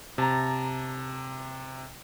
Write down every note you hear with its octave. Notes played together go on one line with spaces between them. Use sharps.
C3 A5 A#5